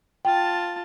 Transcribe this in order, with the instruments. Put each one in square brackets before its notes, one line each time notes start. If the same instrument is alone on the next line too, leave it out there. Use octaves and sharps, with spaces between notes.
[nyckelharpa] F4 A5 [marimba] G5